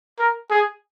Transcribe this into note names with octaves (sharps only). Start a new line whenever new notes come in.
A#4
G#4